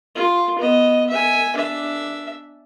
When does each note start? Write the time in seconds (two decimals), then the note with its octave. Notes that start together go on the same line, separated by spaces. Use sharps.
0.15 F4
0.59 B3 D#5
1.10 E5 G#5
1.56 D4 E5